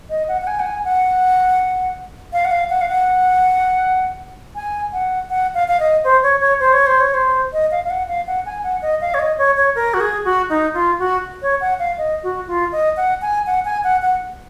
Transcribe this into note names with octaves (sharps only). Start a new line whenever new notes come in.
D#5
F#5
F#5
G#5
F#5
G#5
F#5
F5
F#5
F5
F#5
F5
F#5
G#5
F#5
F#5
F5
F5
D#5
C5
C#5
C#5
C5
C#5
C5
C#5
C5
D#5
F5
F5
F#5
F5
F#5
G#5
F#5
D#5
F5
C#5
D#5
C#5
C#5
A#4
F#4
G#4
F#4
D#4
F4
F#4
C#5
F#5
F5
D#5
F#4
F4
D#5
F#5
G#5
F#5
G#5
F#5
F#5